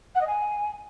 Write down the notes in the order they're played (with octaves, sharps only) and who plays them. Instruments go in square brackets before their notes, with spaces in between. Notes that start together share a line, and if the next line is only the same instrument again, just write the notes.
[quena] F#5
D#5
G#5